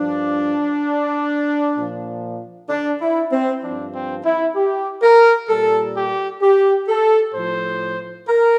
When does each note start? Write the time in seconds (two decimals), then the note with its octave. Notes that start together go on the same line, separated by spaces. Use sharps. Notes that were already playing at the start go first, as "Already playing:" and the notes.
Already playing: G2 F3 D4
1.77 A#2 F3
2.69 D4
3.01 E4
3.31 C4
3.62 G2 F3 D4
3.93 C4
4.24 E4
4.56 G4
5.02 A#4
5.48 A#2 G3 A4
5.95 G4
6.41 G4
6.88 A4
7.34 A2 F3 C5
8.27 A#4